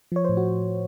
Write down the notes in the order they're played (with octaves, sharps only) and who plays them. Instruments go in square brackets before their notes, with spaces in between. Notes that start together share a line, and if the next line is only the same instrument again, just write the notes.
[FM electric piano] F3 C#5
A2 C5
F#4